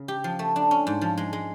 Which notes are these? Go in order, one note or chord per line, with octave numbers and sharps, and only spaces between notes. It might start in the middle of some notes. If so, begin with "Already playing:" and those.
Already playing: C#3
G4
F3
A3
D4
C#4
G#2
F3
G#3
G#3